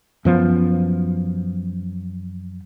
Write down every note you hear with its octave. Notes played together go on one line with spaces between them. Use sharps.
F#2 F3 B3